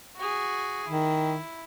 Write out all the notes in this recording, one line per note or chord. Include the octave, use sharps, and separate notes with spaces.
F#4 G#4
D#3 E4